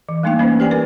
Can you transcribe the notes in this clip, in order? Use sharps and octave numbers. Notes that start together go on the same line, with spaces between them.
E3
G3 A3 A#3 D4 D#4 G5
A#3 C#4 B4 C5
G4 D5 G5 G#5
A#4 B4